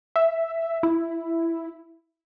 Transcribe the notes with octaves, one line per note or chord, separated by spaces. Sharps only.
E5
E4